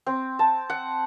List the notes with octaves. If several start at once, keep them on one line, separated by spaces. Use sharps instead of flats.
C4
A5
F#5